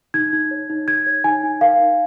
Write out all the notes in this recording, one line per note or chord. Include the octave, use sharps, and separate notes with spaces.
D#4 G#6
D#4
C#5
D#4
D#4 G#6
C#5
D#4 G#5
D#4
A#4 F5
D#4